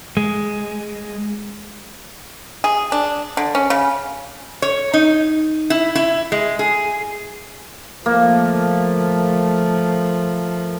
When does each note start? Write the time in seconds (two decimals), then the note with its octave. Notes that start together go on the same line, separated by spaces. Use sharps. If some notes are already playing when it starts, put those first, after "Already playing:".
0.17 G#3
2.64 G#4
2.92 D4
3.37 D3
3.55 C#4
3.70 C#3
4.62 C#5
4.94 D#4
5.70 E4
5.95 E4
6.32 G#3
6.59 G#4
8.06 F3 A3 A#3